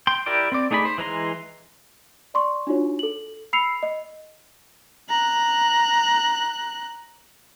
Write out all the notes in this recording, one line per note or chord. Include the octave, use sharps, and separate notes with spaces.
G5 C6
E4 G4 A#4 D5 D6
C4 D5
A3 D#4 G#4 D5 B5
C5
E3 G#3 A#5 C6
D5 C6 C#6
D4 D#4 F4 F#4 C#5
A4 F#7
B5 E6 C7 C#7 F7
D#5
A#5 F#6